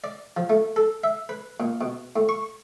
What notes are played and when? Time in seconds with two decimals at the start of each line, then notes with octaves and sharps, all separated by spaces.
0.04 D5
0.37 F3
0.50 A3
0.76 A4
1.04 E5
1.29 B4
1.60 A#2
1.81 B2
2.16 A2
2.29 C#6